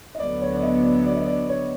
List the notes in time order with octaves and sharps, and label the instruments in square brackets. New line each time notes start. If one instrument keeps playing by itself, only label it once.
[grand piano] D#5
[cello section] D2 D3 F#3 B3 [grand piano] D5
[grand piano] C#5
D5
D#5
D5
D5
D#5
D5
C#5